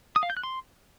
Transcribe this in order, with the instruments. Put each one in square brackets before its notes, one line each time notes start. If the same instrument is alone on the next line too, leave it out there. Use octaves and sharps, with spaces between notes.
[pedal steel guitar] D#6
F5
G6
F#6
C6